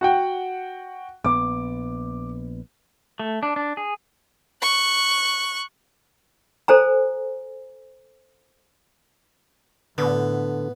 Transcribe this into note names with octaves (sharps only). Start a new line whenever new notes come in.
F#4 F#5 G5
A#1 B3 D6
A3
D4
D4
G#4
C#6 F#6
A4 C5 G#5 A#5
A2 D3 B3